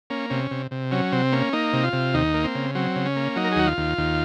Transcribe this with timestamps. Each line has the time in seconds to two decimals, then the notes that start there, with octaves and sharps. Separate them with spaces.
0.10 A#3 C#4
0.30 C3 C#4
0.51 C3
0.71 C3
0.91 F#3 C#4
1.12 C3 C4
1.32 A#3 C#4
1.53 A#3 D#4
1.73 C3
1.84 F4
1.93 C3
2.14 D#2 D#4
2.34 A#3
2.44 C4
2.55 C#3
2.75 F#3 C4
2.96 C#3
3.06 C#4
3.16 A#3
3.36 F#3 D#4
3.44 A#4
3.52 G#4
3.56 D#2 F#4
3.67 F4
3.78 D#2
3.98 D#2